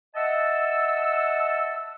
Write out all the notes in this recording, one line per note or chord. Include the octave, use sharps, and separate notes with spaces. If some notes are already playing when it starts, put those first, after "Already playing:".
D#5 E5 F#5 A5 E6